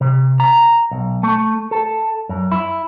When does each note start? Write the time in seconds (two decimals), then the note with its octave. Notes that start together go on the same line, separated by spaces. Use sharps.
0.01 C3
0.40 A#5
0.91 B1
1.23 A3
1.71 A4
2.29 F#2
2.52 E4